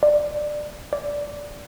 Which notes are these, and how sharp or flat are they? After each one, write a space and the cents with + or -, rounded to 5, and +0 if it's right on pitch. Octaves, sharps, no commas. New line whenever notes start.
D5 +20
D5 -10